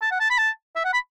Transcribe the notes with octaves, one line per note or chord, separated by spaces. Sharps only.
A5
F#5
A5
B5
A5
E5
F#5
B5